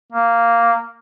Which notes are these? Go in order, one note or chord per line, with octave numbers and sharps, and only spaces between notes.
A#3